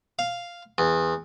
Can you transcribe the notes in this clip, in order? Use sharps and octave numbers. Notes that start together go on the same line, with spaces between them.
F5
E2